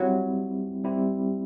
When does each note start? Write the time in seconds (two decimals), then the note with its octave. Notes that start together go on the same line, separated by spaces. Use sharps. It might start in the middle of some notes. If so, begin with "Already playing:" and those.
Already playing: F#3 G3 C4 E4 G4
0.84 G3 C4 E4 G4